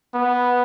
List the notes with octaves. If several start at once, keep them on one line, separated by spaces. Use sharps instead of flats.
B3